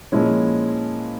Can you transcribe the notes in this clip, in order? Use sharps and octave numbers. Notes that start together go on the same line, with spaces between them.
A#2 F3 G#3 C#4 E4